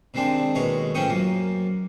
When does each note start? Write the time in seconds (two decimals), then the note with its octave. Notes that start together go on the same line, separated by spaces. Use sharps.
0.14 C3 D#3 G#3 C4 D4
0.55 D#2 B2 G#3 C#5
0.95 A2 F3 C#4 G5 C#6 D#6
1.09 F#2 A#3